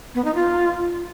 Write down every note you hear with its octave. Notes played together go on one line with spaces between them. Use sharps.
B3
D#4
F4